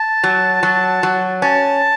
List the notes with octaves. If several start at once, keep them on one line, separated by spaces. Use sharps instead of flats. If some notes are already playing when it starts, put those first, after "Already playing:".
Already playing: A5
F#3
F#3
F#3
C#4 A5